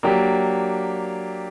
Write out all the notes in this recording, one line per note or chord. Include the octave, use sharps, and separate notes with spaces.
F#3 A#3 D4 G4